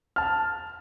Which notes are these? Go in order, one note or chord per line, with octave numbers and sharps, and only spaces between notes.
A5 F6